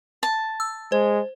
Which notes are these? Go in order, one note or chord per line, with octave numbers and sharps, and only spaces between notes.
A5
E6
G#3 C5